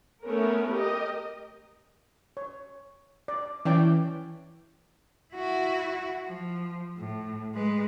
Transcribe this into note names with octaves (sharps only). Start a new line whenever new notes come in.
A3 B3 C#4 A#4
G4 A#4 D#5
C#5
D5
E3 C#4 D5 G5
E4 F#4
F3
A2
G#3 B4